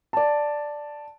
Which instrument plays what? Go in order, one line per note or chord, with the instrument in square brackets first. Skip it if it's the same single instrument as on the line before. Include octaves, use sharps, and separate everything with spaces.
[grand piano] D5 A5